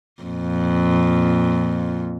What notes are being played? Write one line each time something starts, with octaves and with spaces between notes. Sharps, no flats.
F2 A#2